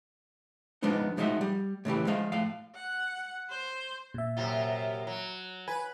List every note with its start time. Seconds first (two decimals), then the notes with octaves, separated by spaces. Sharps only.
0.83 F3 G#3 B3 D4 D#4
1.17 A2 F3 G#3 D#4 F#4 E5
1.41 G3
1.85 A2 C#3 E3 G4
2.07 F3 G#3 F5
2.32 A2 F5
2.75 F#5
3.50 C5
4.14 A#2 E5
4.37 F#2 C3 F4
5.07 F#3
5.68 B4 G#5